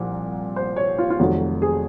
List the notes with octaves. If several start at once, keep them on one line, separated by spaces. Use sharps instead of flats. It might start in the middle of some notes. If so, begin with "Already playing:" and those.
Already playing: C2 A#2 F3
C5
C#5
F4
F4
F1 F2 D#3 F#3 F#4
G#4